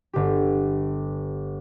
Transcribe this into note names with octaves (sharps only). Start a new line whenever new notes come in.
G1 G4